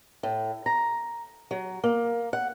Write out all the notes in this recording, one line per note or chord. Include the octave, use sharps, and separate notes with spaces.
A2
A#5
F#3
A#3
F#5